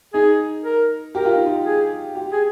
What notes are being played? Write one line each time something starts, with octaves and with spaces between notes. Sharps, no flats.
D#4 G#4
A#4
G4 A#4
F4
D#4
F4
G#4
G4
G#4